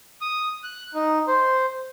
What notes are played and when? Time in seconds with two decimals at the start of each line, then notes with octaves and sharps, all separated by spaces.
0.21 D#6
0.64 F#6
0.94 D#4
1.28 C5